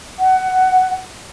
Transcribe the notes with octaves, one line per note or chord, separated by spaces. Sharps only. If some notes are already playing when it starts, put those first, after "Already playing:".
F#5